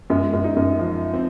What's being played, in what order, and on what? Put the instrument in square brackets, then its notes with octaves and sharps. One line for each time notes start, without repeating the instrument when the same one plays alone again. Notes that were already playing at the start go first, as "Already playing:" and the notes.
[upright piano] F#2 [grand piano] G#3
[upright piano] F#2
[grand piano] D#4
[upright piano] F#2
[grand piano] F3
C4